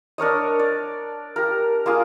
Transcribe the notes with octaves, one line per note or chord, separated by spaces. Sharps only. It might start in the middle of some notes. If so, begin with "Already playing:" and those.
D4 A#4 C#5 D#5
D5
G4 A#4
A#3 F4 G#4